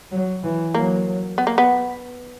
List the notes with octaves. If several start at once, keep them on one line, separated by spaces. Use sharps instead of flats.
F#3
E3
F#3 A#3
B3
A#3
B3